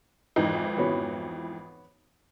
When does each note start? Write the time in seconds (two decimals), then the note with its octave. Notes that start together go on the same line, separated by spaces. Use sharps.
0.36 G#1 F2 E3 D#4
0.78 B3 F#4 C#5